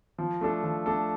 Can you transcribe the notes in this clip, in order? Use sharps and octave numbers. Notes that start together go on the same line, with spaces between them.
F3
A3 D4 A4
F3
A3 D4 A4